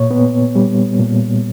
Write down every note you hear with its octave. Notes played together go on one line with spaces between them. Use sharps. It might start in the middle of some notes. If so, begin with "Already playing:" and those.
Already playing: A#2 C#5
B3
G3
A#2